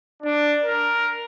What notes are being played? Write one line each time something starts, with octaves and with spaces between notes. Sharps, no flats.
D4
A#4